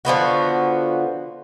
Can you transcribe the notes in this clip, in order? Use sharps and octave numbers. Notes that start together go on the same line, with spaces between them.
D3 F3 B3 F#4